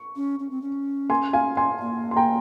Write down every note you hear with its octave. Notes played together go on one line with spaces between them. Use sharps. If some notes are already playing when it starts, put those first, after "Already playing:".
Already playing: C#6
C#4
C#4
C4
C#4
G#5 C6
F5 G#5
G#5 C6
A#3
C6
G5 A#5